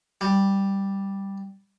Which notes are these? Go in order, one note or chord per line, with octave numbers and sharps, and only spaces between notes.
G3